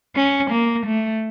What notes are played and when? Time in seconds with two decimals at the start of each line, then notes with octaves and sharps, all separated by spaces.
0.16 C#4
0.51 A#3
0.87 A3